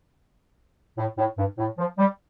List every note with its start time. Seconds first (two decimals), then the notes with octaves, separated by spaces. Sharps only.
0.98 A2
1.18 A2
1.38 G2
1.58 A2
1.78 F3
1.98 G3